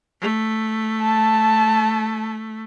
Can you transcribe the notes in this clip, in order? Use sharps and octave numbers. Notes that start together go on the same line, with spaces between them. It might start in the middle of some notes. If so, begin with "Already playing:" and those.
A3
A5